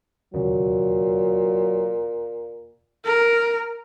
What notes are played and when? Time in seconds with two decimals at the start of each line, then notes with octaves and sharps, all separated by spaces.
0.34 E1 D#2 A#2 C#3 F#3
3.05 A#4